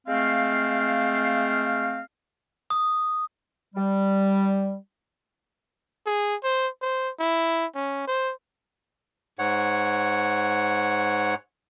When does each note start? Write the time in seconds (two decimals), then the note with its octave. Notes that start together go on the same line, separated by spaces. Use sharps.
0.07 G#3 A3 C4 F5
2.70 D#6
3.75 G3
6.06 G#4
6.44 C5
6.82 C5
7.19 E4
7.75 C#4
8.07 C5
9.39 G#2 C#5 F#5